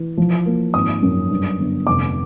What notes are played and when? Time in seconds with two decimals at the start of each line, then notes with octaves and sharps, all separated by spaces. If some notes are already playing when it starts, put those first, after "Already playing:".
Already playing: E3
0.17 F3
0.46 A#3
0.74 G#1 D#6
1.02 F#2
1.30 G2
1.59 G1
1.87 F1 D6